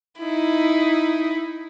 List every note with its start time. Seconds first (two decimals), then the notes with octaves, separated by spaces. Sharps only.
0.20 D#4 E4